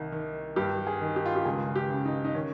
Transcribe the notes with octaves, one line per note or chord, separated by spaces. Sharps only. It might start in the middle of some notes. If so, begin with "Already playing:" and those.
Already playing: C2 D#3
D#3
G2 G4
G#4
D#3
G4
F4
G4
C#2 G#4
G4
C#3
D#4
D#4
D#3 C#4